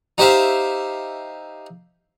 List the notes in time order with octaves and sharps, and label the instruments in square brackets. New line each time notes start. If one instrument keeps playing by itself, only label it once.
[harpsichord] D#4 G4 C5 E5 F5